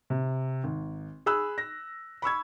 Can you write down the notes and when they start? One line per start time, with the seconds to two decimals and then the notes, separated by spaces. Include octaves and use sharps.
0.10 C3
0.64 G#1
1.26 G#4 B5 E6 F#6
1.58 A#6
2.22 B5 C#6 E6 G#6